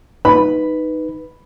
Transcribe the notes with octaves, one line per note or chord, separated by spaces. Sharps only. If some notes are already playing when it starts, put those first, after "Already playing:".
D#4 B4 B5